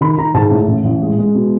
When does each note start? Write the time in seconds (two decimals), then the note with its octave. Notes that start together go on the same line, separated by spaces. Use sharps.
0.01 D#3 B5
0.18 D#3 A#5
0.34 G#2 A5
0.51 A2
0.67 A1
0.84 A1
1.01 G#3
1.18 G#3
1.35 B2